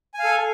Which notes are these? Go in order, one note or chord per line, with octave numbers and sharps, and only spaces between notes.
A4 F5 G#5